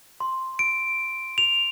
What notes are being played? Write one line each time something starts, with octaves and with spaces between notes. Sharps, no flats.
C6
D7
F7